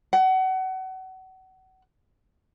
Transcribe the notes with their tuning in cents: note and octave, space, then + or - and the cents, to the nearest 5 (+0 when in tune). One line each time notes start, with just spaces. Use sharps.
F#5 +30